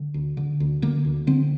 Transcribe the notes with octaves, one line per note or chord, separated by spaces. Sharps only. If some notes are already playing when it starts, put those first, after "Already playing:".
Already playing: D3
D2
D3
D2
D3 A#3
D2
D3 C4